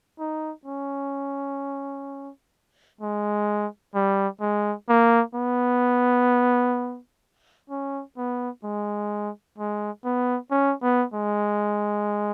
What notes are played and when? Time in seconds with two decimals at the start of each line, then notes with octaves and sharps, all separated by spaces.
0.19 D#4
0.66 C#4
3.01 G#3
3.95 G3
4.41 G#3
4.89 A#3
5.35 B3
7.70 C#4
8.17 B3
8.64 G#3
9.58 G#3
10.05 B3
10.51 C#4
10.82 B3
11.14 G#3